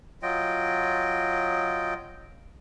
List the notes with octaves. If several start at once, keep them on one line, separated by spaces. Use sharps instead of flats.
F#3 F4 D#5 G5